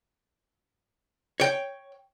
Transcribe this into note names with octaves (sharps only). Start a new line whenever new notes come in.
C#5 G5